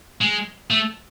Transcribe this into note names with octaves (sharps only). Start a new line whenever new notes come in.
G#3
A3